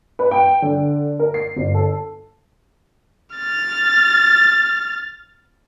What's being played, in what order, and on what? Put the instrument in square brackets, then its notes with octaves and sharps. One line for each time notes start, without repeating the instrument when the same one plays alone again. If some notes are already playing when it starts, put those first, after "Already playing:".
[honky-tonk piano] B4
G5
D3
A#4
C7
G1
A4
[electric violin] F6 A6